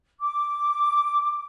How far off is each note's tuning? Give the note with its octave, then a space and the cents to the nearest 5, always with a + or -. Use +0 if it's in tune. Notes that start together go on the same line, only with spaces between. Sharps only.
D6 -5